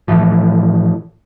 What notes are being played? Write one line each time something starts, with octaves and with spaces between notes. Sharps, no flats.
A2 E3 F3